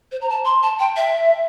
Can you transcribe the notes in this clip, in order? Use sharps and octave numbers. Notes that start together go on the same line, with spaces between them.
C5
A#5
A5
C6
A5
G5
E5